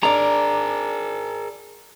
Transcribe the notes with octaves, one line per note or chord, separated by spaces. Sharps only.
D4 G#4 A#4 D5 A#5